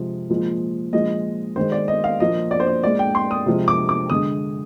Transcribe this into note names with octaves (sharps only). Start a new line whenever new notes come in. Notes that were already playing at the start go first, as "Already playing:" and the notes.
Already playing: C3 F3 G#3
A#2 F3 G#3
A#2 F3 G#3 D#5
D#3 G#3 C5
D5
D#5
F5
A#2 F3 A#3 D#5
D5
C5
D5
A#2 G#3 D5
G5
C6
D#6
C3 F3 G#3
D6
D6
D3 G#3 D#6